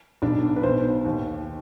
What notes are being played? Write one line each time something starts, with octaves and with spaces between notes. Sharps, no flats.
B1 B2 D4
B4
B1 B2 C5
D#2 D#3